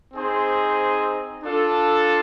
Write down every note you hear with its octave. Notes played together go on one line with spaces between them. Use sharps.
C4 D#4 G#4 C5
D4 F4 A4